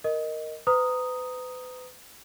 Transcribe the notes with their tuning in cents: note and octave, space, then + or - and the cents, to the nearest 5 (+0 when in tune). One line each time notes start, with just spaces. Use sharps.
A#4 +0 D#5 +0
B4 +35 A#5 +0 D#6 +0